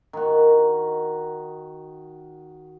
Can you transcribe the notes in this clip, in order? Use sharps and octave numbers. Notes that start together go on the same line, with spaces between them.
D#3 F#4